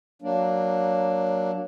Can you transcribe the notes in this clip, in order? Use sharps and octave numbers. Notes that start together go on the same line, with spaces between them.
F#3 A#3 D4